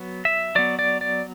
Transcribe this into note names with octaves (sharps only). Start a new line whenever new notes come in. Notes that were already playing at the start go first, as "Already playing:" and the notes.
Already playing: F#3 B3
E5
F#3 B3 D5
D5
D5